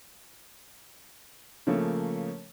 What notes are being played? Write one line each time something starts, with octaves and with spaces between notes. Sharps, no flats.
C#3 F3 A3 A#3